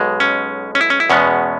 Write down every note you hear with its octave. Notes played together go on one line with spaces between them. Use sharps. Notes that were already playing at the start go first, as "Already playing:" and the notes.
Already playing: B1 B2 G#3
C#4
C#4
E4
C#4
E4
E2 B2 G#3 B3 C#4